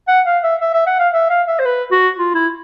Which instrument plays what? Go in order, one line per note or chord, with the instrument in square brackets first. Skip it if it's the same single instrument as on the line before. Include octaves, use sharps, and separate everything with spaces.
[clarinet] F#5
F5
E5
E5
E5
F#5
F5
E5
F5
E5
C5
B4
F#4
F4
E4